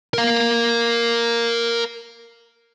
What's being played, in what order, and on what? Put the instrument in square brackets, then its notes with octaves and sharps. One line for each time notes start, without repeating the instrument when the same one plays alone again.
[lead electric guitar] A#4 F5